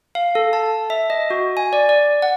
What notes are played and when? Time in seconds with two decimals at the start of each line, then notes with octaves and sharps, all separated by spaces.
0.15 F5
0.35 A4
0.53 A5
0.90 E5
1.10 D#5
1.30 F#4
1.57 G#5
1.73 D5
1.89 D5
2.22 F#5